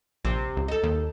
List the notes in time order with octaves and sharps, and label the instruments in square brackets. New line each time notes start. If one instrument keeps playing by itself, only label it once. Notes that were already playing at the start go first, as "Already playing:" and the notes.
[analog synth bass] A#1 [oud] C3
[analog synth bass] C#2
[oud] D#4 A4
[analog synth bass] D#2